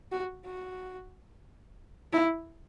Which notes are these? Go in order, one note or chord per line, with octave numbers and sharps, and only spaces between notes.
F#4
F#4
E4